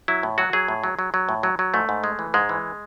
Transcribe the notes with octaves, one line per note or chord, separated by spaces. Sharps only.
F#3 E4
A2
F#3 F#4
F#3 G#4
A2
F#3
F#3
F#3
A2
F#3
F#3
G#2 A3
G#2
G#3
E3
G#2 G#3
E3